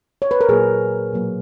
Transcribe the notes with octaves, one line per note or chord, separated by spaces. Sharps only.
C#5
B4
A#4
A#2 F#3 A#3 G#4
B2 F#3 A#3